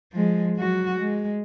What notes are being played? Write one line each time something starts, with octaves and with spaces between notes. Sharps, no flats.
F3 G#3
F#3 F#4
G#3